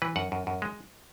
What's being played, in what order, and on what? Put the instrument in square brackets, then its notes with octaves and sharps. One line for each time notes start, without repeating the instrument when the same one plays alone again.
[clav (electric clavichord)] E3 B4
F#2 F#5
F#2
F#2
G#3